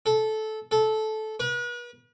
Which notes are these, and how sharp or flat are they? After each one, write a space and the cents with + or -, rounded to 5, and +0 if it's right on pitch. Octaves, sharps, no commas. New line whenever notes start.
A4 -15
A4 -15
B4 -40